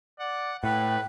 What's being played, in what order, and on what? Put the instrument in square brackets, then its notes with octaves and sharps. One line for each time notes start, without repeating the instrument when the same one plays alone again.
[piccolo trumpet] D5 [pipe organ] F#5
[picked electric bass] A2 [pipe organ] B4 [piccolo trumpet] F#5 [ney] G5